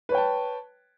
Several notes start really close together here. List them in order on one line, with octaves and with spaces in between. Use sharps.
B4 C#5 G5 A5